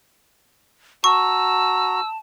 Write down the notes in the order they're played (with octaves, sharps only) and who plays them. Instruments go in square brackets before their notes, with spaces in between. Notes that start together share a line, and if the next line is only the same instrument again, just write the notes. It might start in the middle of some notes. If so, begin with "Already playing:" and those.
[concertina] F#4 A#5 [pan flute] A5 [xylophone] C#6 [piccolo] E6